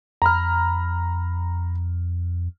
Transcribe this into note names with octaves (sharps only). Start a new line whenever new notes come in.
F2 A#5 B5 F6